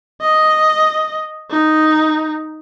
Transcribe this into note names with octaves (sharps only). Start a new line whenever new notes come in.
D#5
D#4